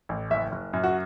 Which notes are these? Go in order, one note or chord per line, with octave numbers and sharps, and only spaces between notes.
A1
F#1 E5
F#1
F#2
F#4